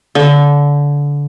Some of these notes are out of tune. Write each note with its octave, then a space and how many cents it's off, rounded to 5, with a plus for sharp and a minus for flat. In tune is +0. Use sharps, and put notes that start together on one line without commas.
D3 -25